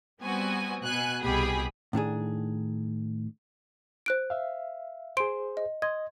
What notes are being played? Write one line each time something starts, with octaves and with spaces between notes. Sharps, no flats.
G3 B3 C4 F#4 G#5
B2 G#5 F#6
C2 B2 G4 G#4 B5
A2 D#3 D4 G#4
C5 F#6 D7
E5 F5
G#4 C5 C6 D7
D#5
D#5 C6 G#6